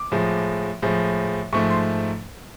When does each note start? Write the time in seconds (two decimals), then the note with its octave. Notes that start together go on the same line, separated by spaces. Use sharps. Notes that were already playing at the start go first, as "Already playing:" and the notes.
Already playing: D6
0.12 A2 F3 G#3
0.82 A2 F3 G#3
1.53 G#2 F3 A3 C#6
1.70 C6